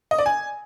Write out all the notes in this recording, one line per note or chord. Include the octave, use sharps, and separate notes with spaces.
D#5
D5
G#5